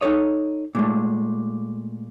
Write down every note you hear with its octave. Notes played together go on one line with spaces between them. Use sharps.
D#4 G4 A4 C#5 D#5
A#2 G#3 A3